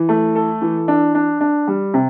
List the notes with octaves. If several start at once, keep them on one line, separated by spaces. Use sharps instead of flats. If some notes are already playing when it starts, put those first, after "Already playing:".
Already playing: E3
A3
A4
E3
D4
D4
D4
G3
C3